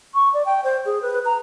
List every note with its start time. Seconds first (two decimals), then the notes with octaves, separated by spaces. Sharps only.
0.15 C#6
0.34 D5
0.46 G5
0.64 C5
0.86 G#4
1.02 B4
1.26 A#5